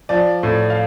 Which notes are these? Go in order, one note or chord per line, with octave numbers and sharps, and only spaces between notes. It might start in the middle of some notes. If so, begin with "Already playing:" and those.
F3 D5
A2
F5